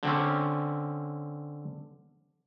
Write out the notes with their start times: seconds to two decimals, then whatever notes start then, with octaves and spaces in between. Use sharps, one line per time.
0.03 D3 C4 C#4